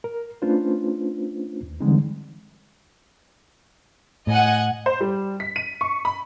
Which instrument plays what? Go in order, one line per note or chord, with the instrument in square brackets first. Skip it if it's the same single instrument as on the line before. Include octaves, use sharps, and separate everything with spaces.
[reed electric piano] A#4
A3 C#4 D4 F4 B4 C5
D#2
D3 E3 G3 G#3 C4 D#4
[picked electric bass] A2 [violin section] D#5 F#5 G#5
[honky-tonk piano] C5
G3
B6
D#7
C#6
B5